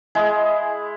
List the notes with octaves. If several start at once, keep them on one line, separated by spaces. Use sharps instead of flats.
G#3 E4 G#4